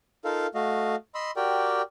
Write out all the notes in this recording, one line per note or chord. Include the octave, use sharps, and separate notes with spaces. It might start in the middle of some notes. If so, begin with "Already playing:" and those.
D#4 F4 A4 A#4 F5
A3 F#4 D#5 F5
D#5 B5 C6 E6
F#4 G4 A#4 D5 G5